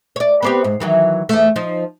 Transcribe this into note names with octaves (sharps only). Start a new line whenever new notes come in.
C#5 D5
B3 C4 G4
G#2
D#3 E3 F#3
E2 A3
F3 D#4